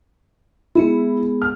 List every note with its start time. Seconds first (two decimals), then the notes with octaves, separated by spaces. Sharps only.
0.75 G#3 B3 E4 G#4
1.42 F6